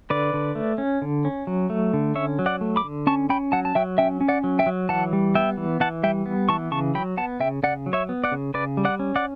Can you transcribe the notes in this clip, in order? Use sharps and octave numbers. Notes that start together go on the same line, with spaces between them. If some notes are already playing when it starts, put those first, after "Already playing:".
D3 B4 D5
D3
A3
C#4
D3
C#4
F#3
A3
D3
C#4 C#5 E5
F#3
D5 F#5
A3
B5 D6
D3
C#4 A5 C#6
C#4 G5 B5
F#3 F#5 A5
A5
F#3 E5 G5
C#4 E5 G5
C#4
D5 F#5
F#3
E5 G5
F#3
E3 F#5 A5
G3
B3 E5 G5
E3
E3 F#5 A5
G3 E5 G5
B3
E3 A5 C#6
C#3 A5 C#6
F#3 G5 B5
B3 F#5 A5
C#3 E5 G5
C#3 D5 F#5
F#3
C#5 E5
B3
D5 F#5
C#3
C#3 B4 D5
G3
D5 F#5
C#4
D5 F#5